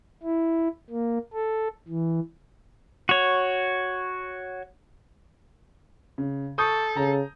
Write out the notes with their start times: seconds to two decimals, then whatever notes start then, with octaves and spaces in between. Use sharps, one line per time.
0.23 E4
0.90 A#3
1.33 A4
1.88 E3
3.09 F#4 C#5
6.18 C#3
6.58 A4 C#6 D#6 G6
6.97 C#3 A#5